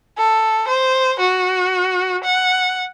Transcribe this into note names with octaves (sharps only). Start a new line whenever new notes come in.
A4
C5
F#4
F#5